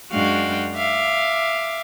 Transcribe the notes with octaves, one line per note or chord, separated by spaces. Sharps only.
F#2 G#3 D4 F#4 F5 G5
E5 F5 D6